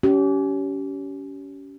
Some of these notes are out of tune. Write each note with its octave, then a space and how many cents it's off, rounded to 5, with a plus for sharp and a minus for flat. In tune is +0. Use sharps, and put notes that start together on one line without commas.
C#4 +25 G4 -30